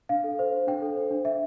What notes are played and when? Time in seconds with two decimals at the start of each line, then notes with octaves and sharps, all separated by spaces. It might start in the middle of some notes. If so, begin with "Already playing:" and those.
0.09 D4 F5
0.24 A4
0.39 C5
0.52 D4
0.67 D4 G5
0.82 A4
0.96 C5
1.11 D4
1.25 D4 E5